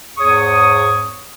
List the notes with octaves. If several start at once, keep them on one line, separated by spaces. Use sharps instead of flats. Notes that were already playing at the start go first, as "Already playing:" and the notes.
E2 G#2 G#4 C#5 C#6 D#6